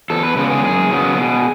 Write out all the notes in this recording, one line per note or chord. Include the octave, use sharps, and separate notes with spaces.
E2 A4
B4
C#3 G#3 B3 B4
G#4
F#2 G#4
C#3 F#3 B3
B2